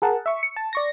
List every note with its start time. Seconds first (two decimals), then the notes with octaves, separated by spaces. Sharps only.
0.02 G#4 A#4 F#5 A5
0.26 E5 C#6
0.43 C#7
0.56 A5
0.73 D5 C#6 A#6